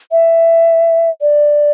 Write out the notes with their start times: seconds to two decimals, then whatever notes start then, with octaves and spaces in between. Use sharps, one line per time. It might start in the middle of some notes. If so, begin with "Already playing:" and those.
0.12 E5
1.21 D5